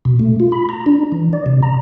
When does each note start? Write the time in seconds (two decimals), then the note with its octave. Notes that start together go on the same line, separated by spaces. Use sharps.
0.05 B2
0.19 A3
0.40 F4
0.52 B5
0.69 A#5
0.86 D4
1.12 E3
1.33 D5
1.46 C3
1.63 A#5